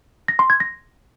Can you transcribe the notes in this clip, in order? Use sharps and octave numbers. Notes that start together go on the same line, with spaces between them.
A#6
C6
G#6
A#6